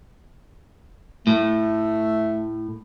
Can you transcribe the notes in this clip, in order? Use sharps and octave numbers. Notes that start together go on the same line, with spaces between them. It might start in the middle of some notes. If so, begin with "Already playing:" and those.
A2 A3